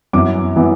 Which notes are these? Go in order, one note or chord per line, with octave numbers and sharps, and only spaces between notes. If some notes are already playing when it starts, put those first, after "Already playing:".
F#2 E3 B3 D6
E3 B3